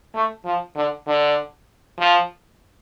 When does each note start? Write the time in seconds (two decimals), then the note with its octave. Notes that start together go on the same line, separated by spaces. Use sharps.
0.15 A3
0.45 F3
0.76 D3
1.07 D3
1.99 F3